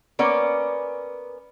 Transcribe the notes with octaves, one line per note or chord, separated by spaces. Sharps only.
A#3 B3 C#4 D5